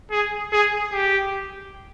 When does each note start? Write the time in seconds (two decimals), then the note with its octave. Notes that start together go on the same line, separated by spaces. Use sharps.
0.11 G#4
0.52 G#4
0.93 G4